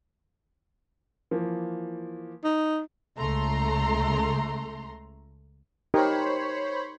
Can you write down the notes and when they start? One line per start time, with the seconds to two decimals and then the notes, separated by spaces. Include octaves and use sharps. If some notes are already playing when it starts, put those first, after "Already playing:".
1.31 E3 F3 A#3
2.44 D#4
3.18 C#2 A3 A#5 C6
5.94 D#4 G4 A#4 C5 C#5 B5